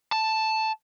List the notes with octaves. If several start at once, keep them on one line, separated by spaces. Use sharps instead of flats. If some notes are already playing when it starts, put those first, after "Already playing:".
A5